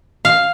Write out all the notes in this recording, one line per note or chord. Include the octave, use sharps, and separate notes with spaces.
F5